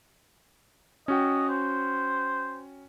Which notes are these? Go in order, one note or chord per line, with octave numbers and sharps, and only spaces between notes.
C#4 F#4 D#5 G5
C5